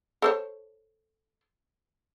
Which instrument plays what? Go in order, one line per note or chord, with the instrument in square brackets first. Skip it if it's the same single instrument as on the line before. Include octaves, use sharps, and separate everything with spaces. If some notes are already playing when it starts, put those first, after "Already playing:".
[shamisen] A4 C5 C#5